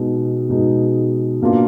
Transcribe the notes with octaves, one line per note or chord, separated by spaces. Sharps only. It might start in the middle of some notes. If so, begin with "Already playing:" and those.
Already playing: B2 G#3 D#4
B2 G#3 D#4
B2 A#3 D4 F4